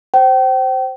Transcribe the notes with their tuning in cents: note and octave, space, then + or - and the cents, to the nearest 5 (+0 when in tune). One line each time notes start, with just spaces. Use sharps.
C5 +0 G5 -35